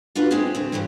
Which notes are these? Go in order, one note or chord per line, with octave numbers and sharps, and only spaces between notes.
D4 F4 F#4 B4
G#3 C4 D4 G4 G#4
D2 C3 C4
G2 C3 E3 C#4